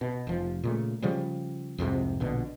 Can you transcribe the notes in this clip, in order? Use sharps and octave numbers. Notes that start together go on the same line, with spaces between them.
B2
F1 F3
A#2 C#3 A3
C#3 F3 G3
C2 F2 G#2 C3
A#1 B2 D3